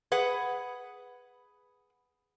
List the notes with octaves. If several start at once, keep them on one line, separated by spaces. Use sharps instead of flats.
G#4 B4 F#5